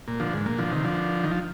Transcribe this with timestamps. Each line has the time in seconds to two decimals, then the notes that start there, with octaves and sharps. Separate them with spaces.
0.08 A#2
0.20 D3 F3
0.33 G#2
0.46 A#2
0.58 D3 F3
0.71 C3 D#3
0.85 D3 F3
1.23 D#3
1.31 F3